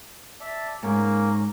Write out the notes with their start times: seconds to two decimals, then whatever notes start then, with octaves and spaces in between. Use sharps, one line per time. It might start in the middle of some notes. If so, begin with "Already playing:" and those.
0.41 D5 E5 A5
0.83 G#2 A#3 C#4 A#4